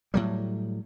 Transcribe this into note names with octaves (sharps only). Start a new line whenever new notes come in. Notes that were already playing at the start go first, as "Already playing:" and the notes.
A2 F#3 G3